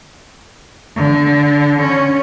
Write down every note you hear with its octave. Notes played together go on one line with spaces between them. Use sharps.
D3
C#4